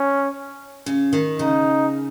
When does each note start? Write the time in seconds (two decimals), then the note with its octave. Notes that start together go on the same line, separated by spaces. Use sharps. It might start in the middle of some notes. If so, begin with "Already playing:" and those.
Already playing: C#4
0.86 C#3
1.13 D#3
1.39 C#3 D#4